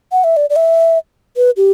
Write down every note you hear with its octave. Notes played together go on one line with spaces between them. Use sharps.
F#5
E5
D5
D5
E5
B4
G4